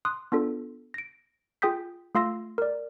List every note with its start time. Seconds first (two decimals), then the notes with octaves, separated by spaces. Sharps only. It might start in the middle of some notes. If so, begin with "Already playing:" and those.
0.05 C6 D#6 F#6
0.32 B3 D4 F4 A4
0.94 A#6 D7
1.62 F4 G#4 G5 D#6 G6 B6
2.15 A3 F4 F5 C6 E6 A#6
2.58 A#4 D5